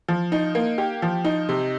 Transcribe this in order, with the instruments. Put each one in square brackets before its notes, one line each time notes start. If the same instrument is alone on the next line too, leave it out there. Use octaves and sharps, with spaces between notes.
[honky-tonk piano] F3
D#4
A#3
G4
F3
D#4
C3